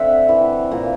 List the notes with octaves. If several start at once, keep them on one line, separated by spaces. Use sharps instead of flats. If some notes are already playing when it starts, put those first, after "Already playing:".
Already playing: D3 C4 D5 E5 F#5
E3
A#2